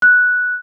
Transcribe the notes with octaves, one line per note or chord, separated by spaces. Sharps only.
F#6